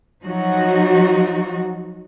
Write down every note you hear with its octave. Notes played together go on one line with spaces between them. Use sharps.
F3 F#3 D#4 F#4